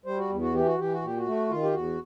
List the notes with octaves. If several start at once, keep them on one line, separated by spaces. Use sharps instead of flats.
G3 C5
F#4
E2
F#4
E3 G4
F#4
E3 G4
F#4
A#2 G4
F#4
A3
D#3 F4
G4
E2 F#4